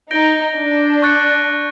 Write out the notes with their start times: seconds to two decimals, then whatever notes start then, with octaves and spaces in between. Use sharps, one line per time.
0.11 D#4 G6 A#6 D7 G7
0.56 D4
1.02 C#6 F#6 A6 C#7